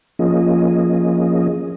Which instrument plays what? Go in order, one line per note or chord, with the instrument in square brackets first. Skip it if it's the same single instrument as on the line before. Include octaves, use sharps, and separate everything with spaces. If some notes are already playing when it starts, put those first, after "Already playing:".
[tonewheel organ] F3 A#3 C#4 F4 G#4 D#5